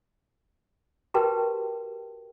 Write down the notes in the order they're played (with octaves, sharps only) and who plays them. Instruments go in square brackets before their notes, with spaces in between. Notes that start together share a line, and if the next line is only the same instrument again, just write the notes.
[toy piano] F#4 G4 A#4 B4 G5 A5